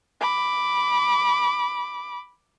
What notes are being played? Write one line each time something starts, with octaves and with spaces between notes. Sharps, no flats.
B5 D6